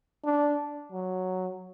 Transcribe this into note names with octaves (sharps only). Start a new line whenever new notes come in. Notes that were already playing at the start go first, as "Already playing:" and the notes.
D4
F#3